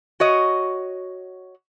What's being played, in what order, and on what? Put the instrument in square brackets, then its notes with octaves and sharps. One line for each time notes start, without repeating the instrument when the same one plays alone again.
[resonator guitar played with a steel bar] F#4 C#5 D#5